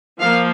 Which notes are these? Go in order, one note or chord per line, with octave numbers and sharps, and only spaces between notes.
F3 A#3 F5